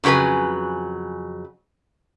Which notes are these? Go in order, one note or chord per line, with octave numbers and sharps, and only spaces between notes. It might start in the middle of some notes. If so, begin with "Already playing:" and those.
F2 C#3 F#3 B4 G#5